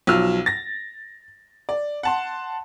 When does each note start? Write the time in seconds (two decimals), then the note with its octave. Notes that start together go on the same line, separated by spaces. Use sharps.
0.07 B1 F3 F#3 E6 F6
0.46 A6 A#6
1.69 D5
2.03 F#5 A5 C6